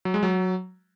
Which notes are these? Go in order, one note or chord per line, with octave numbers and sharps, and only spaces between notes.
F#3
G#3
F#3